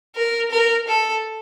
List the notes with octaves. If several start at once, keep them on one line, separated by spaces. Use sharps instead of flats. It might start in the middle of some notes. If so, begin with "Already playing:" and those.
A#4
A#4
A4